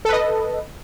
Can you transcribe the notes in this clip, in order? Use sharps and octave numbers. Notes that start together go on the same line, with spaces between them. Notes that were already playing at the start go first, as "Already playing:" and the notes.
A4 B4 D#5